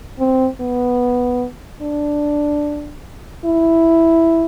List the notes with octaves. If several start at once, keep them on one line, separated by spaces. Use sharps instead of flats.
C4
B3
D4
E4